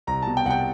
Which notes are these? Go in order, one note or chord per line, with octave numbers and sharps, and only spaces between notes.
C2 A#5
B2 A5
G5
C2 F#5
G5